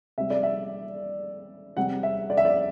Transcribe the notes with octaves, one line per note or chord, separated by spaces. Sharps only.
C3 G3 E5
D5
E5
C3 G3 F#5
E5
D5
E5
D5